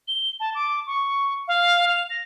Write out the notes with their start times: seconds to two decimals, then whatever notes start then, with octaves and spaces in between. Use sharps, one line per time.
0.08 G7
0.40 A5
0.55 D6
0.87 C#6
1.48 F5
1.88 F7
2.10 A#6